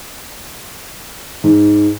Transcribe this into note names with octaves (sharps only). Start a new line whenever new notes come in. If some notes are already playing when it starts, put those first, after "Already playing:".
G#2